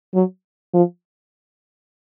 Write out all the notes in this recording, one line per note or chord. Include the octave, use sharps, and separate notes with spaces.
F#3
F3